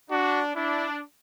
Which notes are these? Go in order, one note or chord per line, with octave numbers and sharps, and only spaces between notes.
D4 F#4
D4 E4